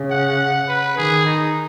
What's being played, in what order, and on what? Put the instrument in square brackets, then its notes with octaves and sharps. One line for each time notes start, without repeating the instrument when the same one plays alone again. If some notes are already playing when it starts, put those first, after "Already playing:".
Already playing: [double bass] C#3
[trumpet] F#5
B4
[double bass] D#3 [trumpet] G#4
[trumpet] D#4